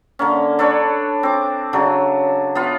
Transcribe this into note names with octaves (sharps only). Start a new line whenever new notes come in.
D3 A#3 C#4
D4 A4 B4 C#5
C4 D6
C#3 F#3 D4
B3 F4